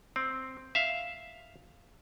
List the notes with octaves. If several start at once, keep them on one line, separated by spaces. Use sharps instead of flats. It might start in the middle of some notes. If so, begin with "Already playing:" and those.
C4
E5 F5